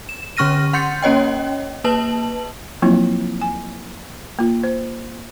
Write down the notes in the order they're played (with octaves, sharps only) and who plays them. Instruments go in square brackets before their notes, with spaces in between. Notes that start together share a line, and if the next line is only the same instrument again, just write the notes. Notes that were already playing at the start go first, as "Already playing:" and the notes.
[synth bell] E7
D3 C#4 C#6 F6 A#6 D#7
F#5 C6 G6 A6 C#7
A#3 C#4 C#5 D#5 G5
A#3 B4 A5 F#7
[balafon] F3 F#3 A#3 C4 E4 F4
G#5
A#3 F4
C5